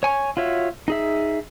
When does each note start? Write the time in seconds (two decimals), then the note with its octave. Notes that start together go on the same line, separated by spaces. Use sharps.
0.03 C#5 G#5 C#6
0.37 F4 F#4 C#5 E5
0.88 D#4 G#4 E5